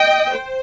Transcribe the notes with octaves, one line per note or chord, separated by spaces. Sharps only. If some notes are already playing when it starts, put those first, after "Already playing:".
Already playing: D#5 G5
C5